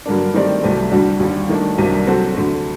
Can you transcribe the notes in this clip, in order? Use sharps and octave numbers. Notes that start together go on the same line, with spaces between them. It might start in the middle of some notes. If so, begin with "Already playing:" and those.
G2 D3 F#3 A#3 D4
D#3 A3 C4 G4 D5
C2 C3 F#3 A3
D2 D3 G3 D4 F#4
D#2 D3 G3
D#3 A3 D4
C2 C3 F#3 A#3 D4
F#3 C4 F#4 A4
D2 D3 A3